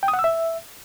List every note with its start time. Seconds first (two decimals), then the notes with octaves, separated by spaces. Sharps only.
0.03 G5
0.08 D#6
0.13 F#5
0.19 E6
0.24 E5